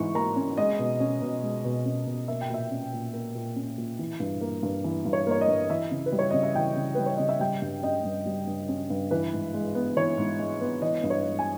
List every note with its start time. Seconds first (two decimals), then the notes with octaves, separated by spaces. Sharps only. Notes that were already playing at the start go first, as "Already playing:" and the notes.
Already playing: G#2 E3 C#6
0.15 A#3 A#5
0.36 C#4
0.57 G#3 D#5
0.79 B2
1.00 C#4
1.22 B2
1.43 G#3
1.65 B2
1.85 C#4
2.06 B2
2.28 A#3 E5
2.41 G5
2.50 A#2 E5
2.71 C#4
2.93 A#2
3.13 A#3
3.35 A#2
3.56 C#4
3.78 A#2
3.99 E3
4.20 G2
4.41 A#3
4.63 G2
4.84 E3
5.05 G2
5.13 C#5
5.27 A#3 C#5
5.41 D#5
5.48 G2
5.70 E3 E5
5.91 C#3
6.06 B4
6.12 G3
6.19 C#5
6.31 C#3 D#5
6.43 E5
6.55 E3 G5
6.76 C#3
6.95 G3 B4
7.06 C#5
7.17 C#3 D#5
7.29 E5
7.40 G3 G5
7.62 G2
7.83 C#4 D#5
8.04 G2
8.26 G3
8.47 G2
8.69 C#4
8.90 G2
9.11 E3 B4
9.33 G#2
9.54 G#3
9.75 B3
9.97 E3 C#5
10.18 G#2
10.39 G#3
10.61 B3
10.82 E3 D#5
11.03 G2
11.10 C#5
11.24 G#3
11.39 G#5